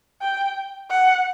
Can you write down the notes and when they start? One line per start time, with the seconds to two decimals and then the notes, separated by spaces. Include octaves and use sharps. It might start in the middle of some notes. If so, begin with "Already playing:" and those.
0.22 G5
0.90 F#5